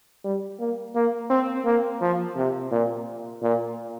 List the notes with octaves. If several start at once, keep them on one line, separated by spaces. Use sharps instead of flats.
G3
A#3
A#3
C4
A#3
F3
C3
A#2
A#2